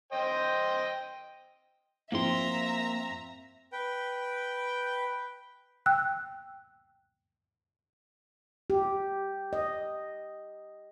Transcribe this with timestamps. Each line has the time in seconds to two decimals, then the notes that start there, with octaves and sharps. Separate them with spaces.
0.12 C5 D#5 G5
2.12 F3 A#3 C4 F4 E5 A#5 C6
3.72 B4 G5
5.86 G5 E6 F#6
8.70 G4
9.53 D#5